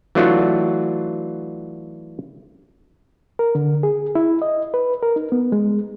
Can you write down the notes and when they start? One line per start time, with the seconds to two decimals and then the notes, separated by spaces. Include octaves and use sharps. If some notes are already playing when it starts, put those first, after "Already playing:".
0.15 E3 F#3 A3 D4 F4 F#4
3.39 A#4
3.55 D3
3.83 G#4
4.15 E4
4.42 D#5
4.74 B4
5.03 A#4
5.16 D#4
5.32 B3
5.52 G#3